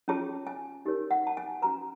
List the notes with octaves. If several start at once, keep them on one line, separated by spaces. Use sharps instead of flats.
C#4 F4 G#4 C#5 A5
G#5
D#4 G4 A#4 C#5
F#5
A5
G#5
C#4 F#4 B4 A#5